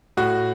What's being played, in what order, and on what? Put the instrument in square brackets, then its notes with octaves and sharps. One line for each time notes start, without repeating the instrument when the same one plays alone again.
[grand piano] A2 F#4